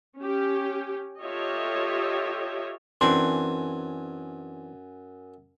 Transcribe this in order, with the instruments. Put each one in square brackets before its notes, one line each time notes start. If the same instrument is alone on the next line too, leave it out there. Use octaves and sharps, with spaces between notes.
[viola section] C#4 G4
F4 G4 A4 C#5 D#5 E5
[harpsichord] F#2 G#5 [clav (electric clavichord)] E3 C4 D4 [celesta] C6